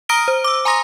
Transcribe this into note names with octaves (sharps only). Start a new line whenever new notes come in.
A#5 D#6 F6 A#6 D7 G7
C5
D6 E6
G#5 A#5 C6 D#6 A#6